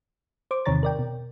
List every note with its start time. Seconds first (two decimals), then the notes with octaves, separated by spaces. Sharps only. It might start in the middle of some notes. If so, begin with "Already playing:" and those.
0.51 C5 D6
0.66 E2 C3 D#3 C#5 A#5 A6
0.83 A#4 D5 G5
0.99 B2